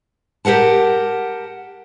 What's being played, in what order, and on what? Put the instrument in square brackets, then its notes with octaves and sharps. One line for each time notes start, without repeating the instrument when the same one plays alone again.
[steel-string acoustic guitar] G4 G#4 A#4 F#5 A5